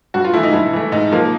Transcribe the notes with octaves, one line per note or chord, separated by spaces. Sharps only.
G2 F#4
F4
E3 A3 E4
D#4
G2 E4
E3 A3
G#2 D#4
F3 A#3